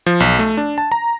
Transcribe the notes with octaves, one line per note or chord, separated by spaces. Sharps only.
F3
B1
A3
D4
A5
A#5